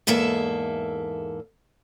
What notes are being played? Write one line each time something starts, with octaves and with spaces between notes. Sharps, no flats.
E2 G#2 A#3 A4 E5